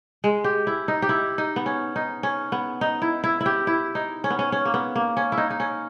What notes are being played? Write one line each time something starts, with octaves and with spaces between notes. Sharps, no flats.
G#3
G4
E4
D#4
G4
E4
D#4
B3
C#4
D#4
C#4
B3
D#4
E4
E4
E4
G4
E4
D#4
C#4
B3
C#4
C#4
A#3
B3
A#3
C#4
E4
D#4
D#4
C#4